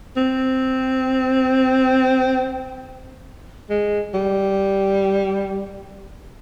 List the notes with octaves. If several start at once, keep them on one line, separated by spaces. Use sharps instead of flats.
C4
G#3
G3